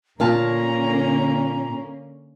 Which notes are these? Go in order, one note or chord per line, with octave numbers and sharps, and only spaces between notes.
A#2 D3 A#3 C#4 F5 A5 A#5